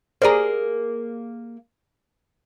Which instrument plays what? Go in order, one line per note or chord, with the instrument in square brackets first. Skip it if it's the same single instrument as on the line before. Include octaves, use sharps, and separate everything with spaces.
[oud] A#3 G#4 [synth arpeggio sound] C5 D5 A#5